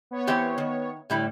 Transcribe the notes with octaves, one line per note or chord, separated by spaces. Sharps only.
B3 C#5
E3 C4 G4
D#3
A2 D3 G3 E4